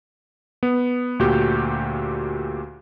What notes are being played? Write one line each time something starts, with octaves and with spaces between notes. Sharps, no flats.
B3
D2 A#2 F#4 G4 G6